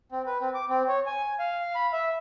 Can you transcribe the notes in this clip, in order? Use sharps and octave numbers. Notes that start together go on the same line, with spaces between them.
C4
B4
C4
D6
C4
C#5
G#5
F5
B5
E5